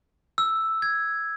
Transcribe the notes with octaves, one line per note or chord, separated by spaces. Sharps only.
E6
G#6